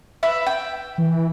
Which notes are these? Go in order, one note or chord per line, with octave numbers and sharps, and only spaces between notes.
B4 E5 B5
G5
E3